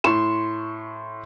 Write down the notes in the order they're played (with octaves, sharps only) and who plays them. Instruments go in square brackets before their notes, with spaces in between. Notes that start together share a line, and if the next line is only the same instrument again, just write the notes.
[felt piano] A2 E7 [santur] C6 C#6